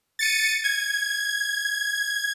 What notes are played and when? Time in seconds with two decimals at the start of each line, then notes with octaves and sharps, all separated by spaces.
0.19 A6 C#7 D#7
0.64 G#6